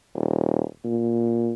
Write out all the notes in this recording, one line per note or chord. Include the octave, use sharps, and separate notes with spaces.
D#1
A#2